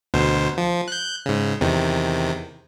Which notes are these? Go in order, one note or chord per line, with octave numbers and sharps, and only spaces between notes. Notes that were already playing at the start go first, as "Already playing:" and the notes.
D2 B2 C5
F3
F#6 G6
G#2 C#3
E2 C3 D#3